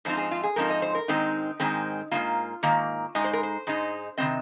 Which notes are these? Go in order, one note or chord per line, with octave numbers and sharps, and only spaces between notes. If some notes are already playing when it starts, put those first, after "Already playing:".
G#2 F3 C4 D#4 C5
G#4
F4
G#4
G#2 F3 C4 D#4 A#4
D#5
C5
A#4
G#2 D#3 G#3 C4 D#4
G#2 D#3 G#3 C4
G#2 D#3 A#3 F4
G#2 D#3 A#3
G#2 G#3 D#4 D#5
C5
A#4
C5
G#2 G#3 D#4
C3 D#3 G#3 C4 D#5